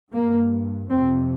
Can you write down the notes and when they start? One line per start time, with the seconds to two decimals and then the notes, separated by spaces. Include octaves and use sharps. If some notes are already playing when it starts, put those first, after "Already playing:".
0.12 G2 A#3
0.90 F2 C3 C4